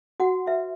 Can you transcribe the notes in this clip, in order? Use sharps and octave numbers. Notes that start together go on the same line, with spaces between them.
F#4 F#5
F#4 B4 E5